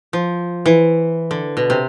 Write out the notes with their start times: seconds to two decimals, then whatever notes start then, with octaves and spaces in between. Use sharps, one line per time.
0.13 F3
0.66 E3
1.31 D3
1.57 B2
1.70 C3